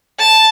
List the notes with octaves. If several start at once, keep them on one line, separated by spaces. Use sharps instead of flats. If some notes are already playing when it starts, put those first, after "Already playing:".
A5